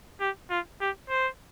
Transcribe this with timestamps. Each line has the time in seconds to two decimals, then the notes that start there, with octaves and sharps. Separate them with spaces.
0.21 G4
0.50 F4
0.81 G4
1.10 C5